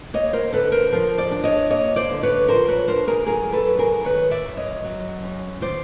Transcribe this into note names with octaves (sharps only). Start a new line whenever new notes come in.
A#3 C#5 D#5
A#4 C5
D3 A4 B4
A#4 C5
F3 A#4 C5
C5 D5
D4
C#5 D#5
A#3 C#5 D#5
C5 D5
D3
B4 C#5
F3 A#4 C5
B4 C#5
D4 A#4 C5
G#4 A#4
F#3 G#4 A#4
A4 B4
F#2
G#4 A#4
D#3 B4 C#5
D5 E5
F#2
C#5 D#5
F#3
F#2
D#3 C5 D5